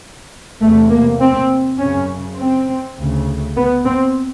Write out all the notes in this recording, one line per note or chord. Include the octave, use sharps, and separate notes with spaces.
E2 C3 A3
A#3
C4
F#2 C#3 C#4
C4
D2 C#3
B3
C4